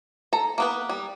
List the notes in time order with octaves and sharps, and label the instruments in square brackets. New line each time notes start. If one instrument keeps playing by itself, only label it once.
[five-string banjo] A4 A#5
A#3 B3 B4
G3